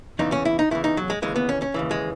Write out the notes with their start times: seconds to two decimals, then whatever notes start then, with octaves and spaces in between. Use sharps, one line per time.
0.19 E2 C#3 E3 D#4
0.32 C#4
0.45 E4
0.59 D#4
0.71 E2 C#3 E3 E4
0.84 D#4
0.97 F#3
1.10 G#3
1.22 D#2 C#3 E3 G#3
1.36 B3
1.49 C#4
1.62 C#4
1.74 D#2 C#3 E3
1.91 G#3